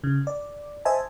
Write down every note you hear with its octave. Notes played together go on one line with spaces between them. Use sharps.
C#3
D5
C5 D#5 E5 G#5 A5